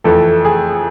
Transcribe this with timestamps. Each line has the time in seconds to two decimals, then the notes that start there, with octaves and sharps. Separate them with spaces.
0.04 F2 E3 A3 A4
0.45 G#4